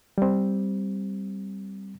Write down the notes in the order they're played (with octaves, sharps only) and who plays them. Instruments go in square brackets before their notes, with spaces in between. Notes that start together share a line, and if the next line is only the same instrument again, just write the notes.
[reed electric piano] G3 C4